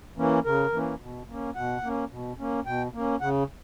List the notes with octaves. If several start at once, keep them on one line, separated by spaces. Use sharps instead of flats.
E3 A#3 C#4
C#3 A#4
E3 A#3 C#4
B2
A#3 C#4
B2 F#5
A#3 C#4
B2
A#3 C#4
B2 G5
A#3 C#4
C#3 F#5